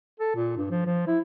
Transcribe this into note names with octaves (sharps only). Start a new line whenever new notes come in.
A4
A#2
G2
F3
F3
E4